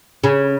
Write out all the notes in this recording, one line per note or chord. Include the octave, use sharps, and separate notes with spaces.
C#3